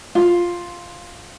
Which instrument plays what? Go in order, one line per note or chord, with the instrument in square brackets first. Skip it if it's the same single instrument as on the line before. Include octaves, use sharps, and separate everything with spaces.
[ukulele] F4